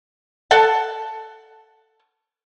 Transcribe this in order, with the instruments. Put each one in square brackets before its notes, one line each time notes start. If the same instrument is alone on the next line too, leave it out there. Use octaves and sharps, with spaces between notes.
[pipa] A4 F#5 A5